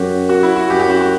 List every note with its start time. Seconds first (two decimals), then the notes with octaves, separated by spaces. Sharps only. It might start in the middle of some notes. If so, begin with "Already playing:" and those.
Already playing: F#2 F#4 G4
0.29 F#4
0.43 E4
0.56 F#4
0.69 F#2 G4
0.80 G4
0.90 F#4
1.01 F#4